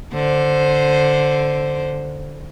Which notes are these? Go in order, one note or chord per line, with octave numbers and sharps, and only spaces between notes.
D3 C5